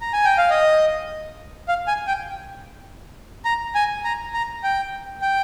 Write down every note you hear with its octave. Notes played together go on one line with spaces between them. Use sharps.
A#5
G#5
G5
F5
D#5
F5
G#5
G5
A#5
G#5
A#5
A#5
G5
G5